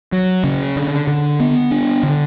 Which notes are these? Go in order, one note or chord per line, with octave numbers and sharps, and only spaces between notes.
F#3
C#3
D3
D3
B3
D4
D3